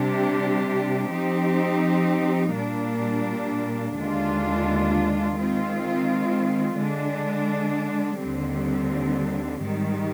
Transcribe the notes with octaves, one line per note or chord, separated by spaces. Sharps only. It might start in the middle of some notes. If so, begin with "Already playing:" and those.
Already playing: C3 G3 D4 G4
F3 C4 D#4 G4
A#2 G3 A#3 D4
D#2 D3 G#3 D4 F4
D#3 G#3 C4 F4
D3 G#3 D4
D#2 D3 G3 C4
G#2 D#3 G3